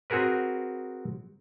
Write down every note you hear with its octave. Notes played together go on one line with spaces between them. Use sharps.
C4 F#4 G#4 A#4 B4